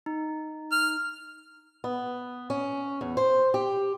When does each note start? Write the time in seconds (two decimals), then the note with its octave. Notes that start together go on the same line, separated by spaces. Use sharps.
0.06 D#4
0.72 F6
1.84 B3
2.50 C#4
3.01 E2
3.17 C5
3.54 G4